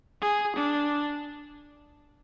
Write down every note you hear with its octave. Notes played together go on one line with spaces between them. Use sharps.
G#4
D4